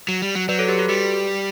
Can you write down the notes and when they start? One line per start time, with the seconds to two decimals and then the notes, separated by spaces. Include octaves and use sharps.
0.08 F#3
0.22 G3
0.35 F#3
0.49 F#3 B4 D5
0.59 A4 C#5
0.68 G4 B4
0.79 F#4 A4
0.89 G3 G4 B4